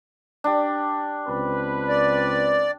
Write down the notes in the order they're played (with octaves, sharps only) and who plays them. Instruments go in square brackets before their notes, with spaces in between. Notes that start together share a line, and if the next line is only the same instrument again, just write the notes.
[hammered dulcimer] D4 G4
[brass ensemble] C#2 C4 B4
[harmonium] D5